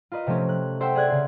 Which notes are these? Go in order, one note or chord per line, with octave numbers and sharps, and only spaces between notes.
F4 A#4 B4 D#5
C3 F3 A3 C4 C#4
F#6
A4 C5 E5 F#5 G5 E6
G#4 D5 F#6 G#6
C#3 G#4 C5